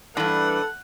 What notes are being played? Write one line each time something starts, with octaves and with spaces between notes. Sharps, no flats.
G2 E3 D4 A4 B4 F#5